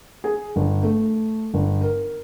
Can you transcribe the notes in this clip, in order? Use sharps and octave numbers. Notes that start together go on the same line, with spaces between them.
G#4
G1
A3
G1
A#4